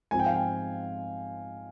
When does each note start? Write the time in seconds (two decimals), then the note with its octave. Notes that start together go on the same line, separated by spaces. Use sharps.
0.11 G#2 F3 C4 G#5
0.19 G5
0.26 F5
0.34 G5